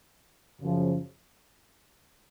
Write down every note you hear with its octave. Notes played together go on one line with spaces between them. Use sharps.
F#2 C#3 F3